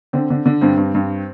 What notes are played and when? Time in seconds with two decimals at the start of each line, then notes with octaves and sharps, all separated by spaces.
0.13 D3 C4
0.30 D3
0.46 D3
0.61 G2 C4
0.77 G2
0.95 G2